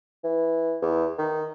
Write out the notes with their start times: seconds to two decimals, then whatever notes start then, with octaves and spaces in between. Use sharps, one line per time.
0.24 E3
0.82 E2
1.18 D#3